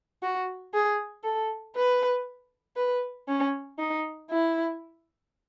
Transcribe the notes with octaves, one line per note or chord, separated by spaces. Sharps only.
F#4
G#4
A4
B4
B4
C#4
D#4
E4